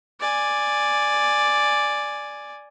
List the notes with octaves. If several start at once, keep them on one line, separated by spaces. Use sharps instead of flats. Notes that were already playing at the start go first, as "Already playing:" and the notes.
D5 G#5